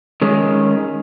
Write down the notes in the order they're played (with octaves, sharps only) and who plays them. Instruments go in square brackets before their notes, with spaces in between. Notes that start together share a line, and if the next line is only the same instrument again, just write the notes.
[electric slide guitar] D#3 G#3 C#4